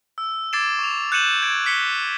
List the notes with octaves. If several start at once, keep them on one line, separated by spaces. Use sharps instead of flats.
E6
D6 G#6 A6 C7 D7 E7
C#6 F7
F#6 G6 C#7 D#7 E7 F#7
G#6 D7
F6 B6 C#7 G7